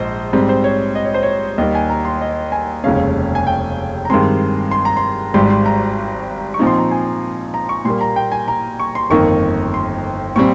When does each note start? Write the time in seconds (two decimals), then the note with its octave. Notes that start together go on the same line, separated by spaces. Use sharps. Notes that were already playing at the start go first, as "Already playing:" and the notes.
Already playing: A#1 G#2 C5 D#5
0.33 G#2 G3 C4
0.49 C5
0.64 C#5
0.95 D#5
1.05 C#5
1.14 C5
1.23 C#5
1.58 D#2 D#3 G3 D#5
1.75 G#5
1.89 A#5
2.05 C6
2.21 D#5
2.52 G#5
2.84 F1 D#2 C#3 G#3 C#4 F5
3.35 G#5
3.47 G5
4.05 A#5
4.10 G2 D#3 G#3 C4 C6
4.71 C6
4.85 A#5
4.97 C6
5.34 G#1 G#2 G3 C6
5.50 C6
5.66 A#5
6.54 C#6
6.59 A#2 F3 C4 D#4
6.67 C6
6.78 A#5
6.91 G#5
7.54 A#5
7.69 C#6
7.85 A#2 G3 A#3 C6
8.01 A#5
8.16 G5
8.32 G#5
8.48 A#5
8.80 C#6
8.95 C6
9.10 G1 F2 D#3 A#3 D#4 C#6
9.74 C6
10.36 A#2 G3 C4 C#6